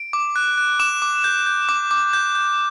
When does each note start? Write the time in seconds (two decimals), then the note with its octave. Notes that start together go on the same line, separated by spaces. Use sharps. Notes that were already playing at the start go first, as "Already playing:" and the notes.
Already playing: D7
0.13 D6
0.36 F#6
0.57 F#6
0.80 D6 E7
1.02 D6
1.24 G6
1.46 G6
1.69 D6
1.91 D6
2.13 G6
2.35 G6